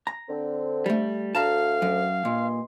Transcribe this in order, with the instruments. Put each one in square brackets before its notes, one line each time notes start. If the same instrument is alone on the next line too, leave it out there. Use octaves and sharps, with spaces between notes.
[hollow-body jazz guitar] A#5
[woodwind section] D3 C4
[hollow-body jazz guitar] G3 A3
[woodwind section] D2 [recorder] F5 [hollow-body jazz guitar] A5 A#5
[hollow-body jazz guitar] F#2
[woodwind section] G2 D#5 C6 [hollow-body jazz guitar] A#2